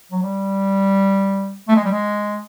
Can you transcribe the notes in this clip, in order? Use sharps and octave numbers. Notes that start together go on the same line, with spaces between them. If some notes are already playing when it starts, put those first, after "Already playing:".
F#3
G3
A3
G#3
G3
G#3